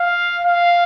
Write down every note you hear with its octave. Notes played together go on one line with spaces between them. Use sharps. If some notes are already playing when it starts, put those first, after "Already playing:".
Already playing: F5
F5